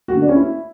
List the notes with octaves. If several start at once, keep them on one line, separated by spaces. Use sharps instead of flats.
F#4
D3
D4
C#4
E4